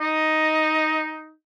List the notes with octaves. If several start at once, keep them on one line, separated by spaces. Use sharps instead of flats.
D#4 D#5